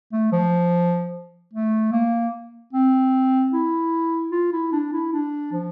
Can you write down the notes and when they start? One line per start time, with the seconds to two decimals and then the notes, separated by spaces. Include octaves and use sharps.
0.13 A3
0.33 F3
1.53 A3
1.92 A#3
2.73 C4
3.53 E4
4.32 F4
4.53 E4
4.73 D4
4.93 E4
5.13 D4
5.52 F3